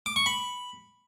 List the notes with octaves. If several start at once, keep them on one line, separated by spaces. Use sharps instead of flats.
D6
C#6
B5